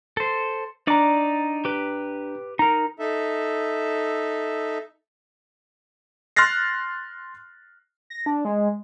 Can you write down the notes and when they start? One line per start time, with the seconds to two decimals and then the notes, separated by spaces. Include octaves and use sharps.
0.17 A4 C5
0.87 D4 D#4 D5 A#5 D6
1.65 G4 B4
2.59 D#4 A#4 A#5
2.99 D#4 A4 E5
6.36 C6 F6 F#6 A6 A#6 C7
8.10 A#6
8.26 D4
8.45 G#3